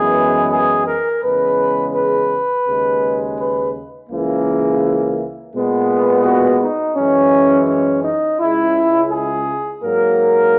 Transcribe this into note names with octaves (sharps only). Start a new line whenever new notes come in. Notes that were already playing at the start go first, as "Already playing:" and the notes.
Already playing: F#2 E3 G#3 B3 G#4
G#4
A#4
E2 C#3 G#3 B4
B4
D#2 C#3 G#3
B4
C#2 C#3 E3 A#3
A#2 G#3 B3
F#4
D#4
F#2 E3 G#3 C#4
C#4
D#4
C#2 C#3 G#3 E4
G#4
G#2 F#3 A#3 A#4